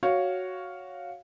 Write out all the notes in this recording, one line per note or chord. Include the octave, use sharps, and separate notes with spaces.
F#4 C#5 F5